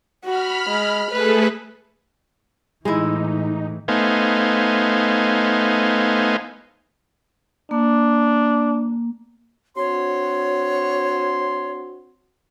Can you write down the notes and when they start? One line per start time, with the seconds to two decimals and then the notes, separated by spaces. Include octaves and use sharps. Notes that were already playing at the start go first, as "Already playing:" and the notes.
0.25 F#4 B5 F6
0.70 G#3
1.11 A3 G#4 A4 B4
2.85 A2 E3 G#3 D#4 E4
3.88 A3 B3 D#4 C5 F5 G#5
7.71 A#3 D4
9.77 C4 D4 F#4 C#5 C6